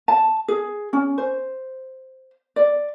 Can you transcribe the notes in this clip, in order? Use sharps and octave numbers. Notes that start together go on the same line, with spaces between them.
A5
G#4
C#4
C5
D5